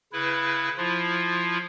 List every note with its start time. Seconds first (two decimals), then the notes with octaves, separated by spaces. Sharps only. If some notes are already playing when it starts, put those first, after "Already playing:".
0.13 C#3 E4 B4
0.77 F3 E4 F4